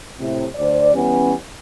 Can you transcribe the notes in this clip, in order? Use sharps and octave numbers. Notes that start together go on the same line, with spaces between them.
A2 C3
D2 C5 D5
E3 G3 B3 C#4